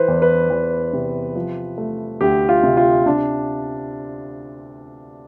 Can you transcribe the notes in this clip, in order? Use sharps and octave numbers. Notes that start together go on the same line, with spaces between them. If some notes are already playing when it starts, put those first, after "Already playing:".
Already playing: E3 B4 C5
E2
B4
E2
C3
F3
A3
D2 G4
F4
C3
F4
C3 D4